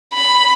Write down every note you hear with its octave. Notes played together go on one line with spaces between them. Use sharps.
B5